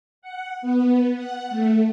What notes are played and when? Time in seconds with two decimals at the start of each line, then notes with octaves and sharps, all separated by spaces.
0.22 F#5
0.62 B3
1.15 F#5
1.50 A3